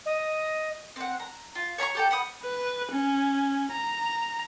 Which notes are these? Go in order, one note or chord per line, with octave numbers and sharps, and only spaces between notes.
D#5
C4 F#5
A#5
F4
C#5 A#5 B5 C#6
G4 A4 G5
F#5 B5 D#6
B4
C#4
A#5